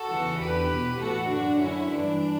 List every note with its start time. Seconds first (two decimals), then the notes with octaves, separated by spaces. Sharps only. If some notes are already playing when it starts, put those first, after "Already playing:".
Already playing: F#4 A4
0.11 E2 C#3 E3
0.40 E2 D3 G4 B4
0.70 E2 B2
1.00 A2 E3 F#4 A4
1.30 F#2 D3 D4 F#4
1.60 F#2 D3 C#4 E4
1.90 G2 E3 D4